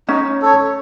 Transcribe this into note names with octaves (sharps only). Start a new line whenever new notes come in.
C#4 D#4
A4 C#5